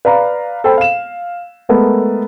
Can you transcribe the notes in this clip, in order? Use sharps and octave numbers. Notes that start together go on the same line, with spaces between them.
B4 D5 F5 A#5
A4 C5 G5 B5
F5 E7
G#3 A3 B3 A4 A#4